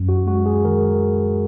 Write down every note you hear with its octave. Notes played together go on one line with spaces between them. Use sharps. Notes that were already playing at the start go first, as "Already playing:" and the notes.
Already playing: F#2
F#4
G#3 F#4
G#4
D#3 A#4